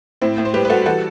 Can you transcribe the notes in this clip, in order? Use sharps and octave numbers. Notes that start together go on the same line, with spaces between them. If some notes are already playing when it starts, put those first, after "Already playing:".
A2 C4 E4
A2
C5
G3 G4 B4
B4
G3 F#4 A4
E3 F#4 A4